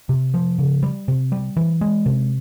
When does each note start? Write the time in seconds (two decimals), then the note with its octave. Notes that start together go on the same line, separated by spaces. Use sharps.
0.09 C3
0.34 F3
0.58 C#3
0.83 G3
1.08 C3
1.32 G3
1.56 E3
1.81 G#3
2.06 C3